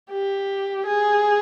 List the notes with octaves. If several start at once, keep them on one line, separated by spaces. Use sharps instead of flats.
G4
G#4